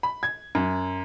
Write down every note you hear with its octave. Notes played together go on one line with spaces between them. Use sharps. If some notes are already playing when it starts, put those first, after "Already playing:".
B5
G#6
F#2